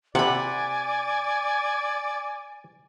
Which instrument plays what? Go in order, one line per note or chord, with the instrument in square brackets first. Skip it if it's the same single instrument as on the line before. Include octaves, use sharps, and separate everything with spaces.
[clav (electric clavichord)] C3 [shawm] D5 [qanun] F#5 B5 [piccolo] G#5